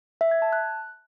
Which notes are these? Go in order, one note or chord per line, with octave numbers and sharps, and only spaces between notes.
E5
G#6
A5
F#6